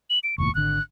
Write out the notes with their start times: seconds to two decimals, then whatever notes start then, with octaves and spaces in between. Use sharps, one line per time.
0.10 F#7
0.24 D7
0.38 F1 D#2 A2 C#6
0.55 G#1 D3 F#6